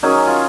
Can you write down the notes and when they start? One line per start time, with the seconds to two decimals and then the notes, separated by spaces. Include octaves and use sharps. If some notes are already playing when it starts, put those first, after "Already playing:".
0.03 D#3 F#3 C#4 G#4
0.27 F4